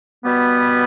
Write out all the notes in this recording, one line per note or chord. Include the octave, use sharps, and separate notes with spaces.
B2 G3 B3